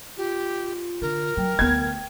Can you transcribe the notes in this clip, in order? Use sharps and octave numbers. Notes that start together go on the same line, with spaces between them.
F4 G4
D3 A#4
F#3 G5
D2 B3 G#6